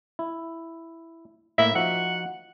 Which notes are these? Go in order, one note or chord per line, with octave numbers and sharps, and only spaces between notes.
E4
A2 A#3 E5
F3 D#4 F#4 F#5